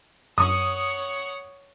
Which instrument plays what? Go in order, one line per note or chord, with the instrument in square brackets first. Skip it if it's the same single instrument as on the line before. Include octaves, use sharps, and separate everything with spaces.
[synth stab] F#2 [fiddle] C#5 F#5 [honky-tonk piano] D#6